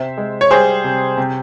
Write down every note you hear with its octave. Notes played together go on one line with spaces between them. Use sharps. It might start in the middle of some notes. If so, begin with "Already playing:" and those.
Already playing: C3 C5 E5
G#3
C#5
G3 G#4 C5
C3
C3